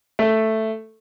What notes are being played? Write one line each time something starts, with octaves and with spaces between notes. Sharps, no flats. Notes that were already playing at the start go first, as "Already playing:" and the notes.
A3